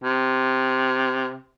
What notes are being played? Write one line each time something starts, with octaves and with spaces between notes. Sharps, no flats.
C3